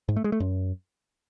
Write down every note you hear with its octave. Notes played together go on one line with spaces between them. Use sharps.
G#2
A3
G#3
A3
F#2